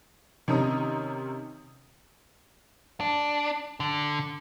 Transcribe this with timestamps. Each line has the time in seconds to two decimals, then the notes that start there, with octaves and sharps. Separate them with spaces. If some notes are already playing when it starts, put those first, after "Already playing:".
0.48 C3 D#3 C#4 A#5 D#6
3.00 D4
3.80 D3